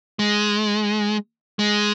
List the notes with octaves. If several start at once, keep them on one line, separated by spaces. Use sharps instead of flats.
G#3
G#3